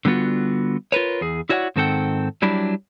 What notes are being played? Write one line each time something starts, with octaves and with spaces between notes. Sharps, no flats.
D3 G3 B3 F4 F#4
F4 A#4 B4 C#5
E2 G#4
E4 F#4 C#5 D5 F5 F#5
G#2 D#3 C4 A4 F#5 G5
F#3 G3 D4 E4 G4